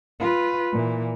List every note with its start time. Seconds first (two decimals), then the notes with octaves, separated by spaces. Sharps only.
0.20 F4 B4
0.72 A#2 E3